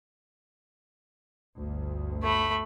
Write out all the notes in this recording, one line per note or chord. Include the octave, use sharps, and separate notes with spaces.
G1 D2
A3 B5